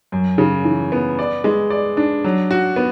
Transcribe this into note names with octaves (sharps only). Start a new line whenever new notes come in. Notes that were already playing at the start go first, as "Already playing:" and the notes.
F#2
C#3
E3
B3
D5
G#3
D5
D4
F#3
F#4
B3